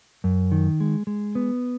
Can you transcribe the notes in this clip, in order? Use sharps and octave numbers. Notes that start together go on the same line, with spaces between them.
F#2
D#3
G#3
G#3
B3